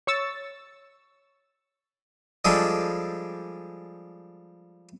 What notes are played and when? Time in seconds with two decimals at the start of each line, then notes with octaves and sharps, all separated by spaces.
0.07 C#5 C#6 E6 A6
2.45 F3 G3 G#3 D4 G#4 A4